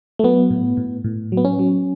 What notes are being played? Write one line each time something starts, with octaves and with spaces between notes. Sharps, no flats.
A3
F#3 B3
A2
A2
A2
F#3
B3
C#4
F#3